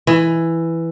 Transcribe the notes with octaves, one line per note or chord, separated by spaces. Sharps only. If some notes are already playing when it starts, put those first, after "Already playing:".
E3